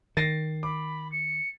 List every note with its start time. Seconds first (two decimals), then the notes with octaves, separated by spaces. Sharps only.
0.17 D#3 A6 A#6 C7
0.63 B5 D6
1.12 C#7